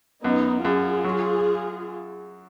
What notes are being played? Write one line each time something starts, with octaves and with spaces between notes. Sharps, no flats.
F#2 B3 D#4
F#2 F4 G#4
F#3